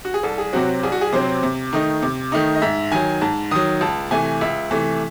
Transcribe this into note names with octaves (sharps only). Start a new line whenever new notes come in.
F#4
G#4
C2 A4
G#4
C3 F#3 C4 F#4
C2 G#4
F#4
G#4
C3 F#3 C4 C5
C3
D#3 A3 D#4
C3
D#3 A3 D#4
D#5
G#2 E5
D#3 F#3 G#5
G#2 A5
D#3 F#3 D#6
C#2 A5
C3 E3 A3 G#5
C#2 E5
C3 E3 A3